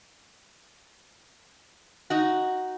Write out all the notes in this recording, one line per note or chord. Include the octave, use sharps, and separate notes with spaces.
D#4 F#4